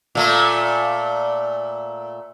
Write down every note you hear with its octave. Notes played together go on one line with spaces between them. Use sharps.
A#2 A3